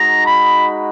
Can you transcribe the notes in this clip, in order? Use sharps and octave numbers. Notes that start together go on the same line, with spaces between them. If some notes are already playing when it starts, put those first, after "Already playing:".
Already playing: G#3 D#4 F#4 A#5
B5